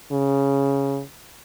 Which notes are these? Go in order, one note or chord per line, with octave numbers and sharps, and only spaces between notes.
C#3